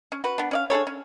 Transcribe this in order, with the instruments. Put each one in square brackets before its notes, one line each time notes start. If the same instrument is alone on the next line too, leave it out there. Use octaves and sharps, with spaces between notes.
[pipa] C#4
F#4 B4
B3 D4
C#4 D5 F5
D4 G#4 A4 C#5
C#4